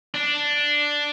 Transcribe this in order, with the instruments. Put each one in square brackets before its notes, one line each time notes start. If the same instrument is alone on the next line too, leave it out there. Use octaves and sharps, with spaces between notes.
[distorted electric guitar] D4